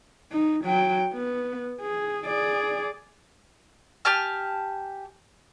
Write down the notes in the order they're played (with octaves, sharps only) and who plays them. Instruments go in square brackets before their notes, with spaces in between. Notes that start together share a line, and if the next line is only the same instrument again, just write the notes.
[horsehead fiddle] D#4
F#3 G5
B3
G#4
G#4 D5
[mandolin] G4 G#5 A5 F6